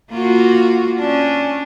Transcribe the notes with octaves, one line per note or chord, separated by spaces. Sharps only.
A#3 F4 F#4
C#4 D4